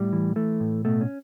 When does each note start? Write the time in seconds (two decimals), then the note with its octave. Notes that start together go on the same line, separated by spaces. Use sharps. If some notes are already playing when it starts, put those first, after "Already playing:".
Already playing: A2 G3
0.13 E3
0.36 E3 A3
0.60 A2
0.85 B2 A3
1.01 C#4